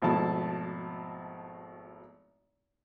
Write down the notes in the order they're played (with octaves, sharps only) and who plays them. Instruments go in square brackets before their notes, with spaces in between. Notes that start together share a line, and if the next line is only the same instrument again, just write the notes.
[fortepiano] G#1 B2 F3 A3 E4 A5